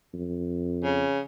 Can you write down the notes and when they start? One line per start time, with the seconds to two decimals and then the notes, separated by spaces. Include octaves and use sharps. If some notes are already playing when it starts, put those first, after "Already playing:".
0.14 F2
0.84 C#3